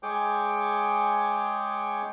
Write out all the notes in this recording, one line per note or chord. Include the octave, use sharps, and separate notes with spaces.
G#3 G#4 C#5 G5 D6